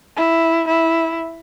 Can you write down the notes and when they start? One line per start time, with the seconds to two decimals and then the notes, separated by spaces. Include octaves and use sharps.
0.17 E4
0.67 E4